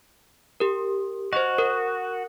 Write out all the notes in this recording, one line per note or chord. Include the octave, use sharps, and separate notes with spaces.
G4 A#4
F#4 C5 D#5
A#4